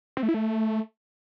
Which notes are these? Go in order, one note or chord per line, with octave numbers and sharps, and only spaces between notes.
C4
A3
E4
A3